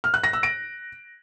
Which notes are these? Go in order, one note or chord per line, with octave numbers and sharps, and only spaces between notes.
F6
F#6
A#6
E6
D7